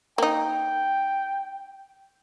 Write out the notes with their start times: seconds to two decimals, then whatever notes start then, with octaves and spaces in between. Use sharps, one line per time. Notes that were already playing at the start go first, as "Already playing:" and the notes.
0.18 A#3 D#4 G5